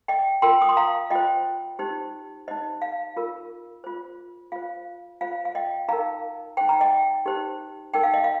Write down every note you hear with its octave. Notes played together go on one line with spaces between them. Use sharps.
D#5 G5
F4 A#4 G5 C6
D#6
C6
F5 A#5
F4 C5 D#5 G5
D#4 G4 C5
D#4 C5 D#5
F5
F4 A#4
F4 C5
F4 C5 F5
F4 C5 F5
F5
D#5 G5
D#4 A#4 F5 A#5
D#4 C5 G5
A#5
D#5 G5
D#4 G4 C5
D#4 A#4 G5
F5
D#5
F5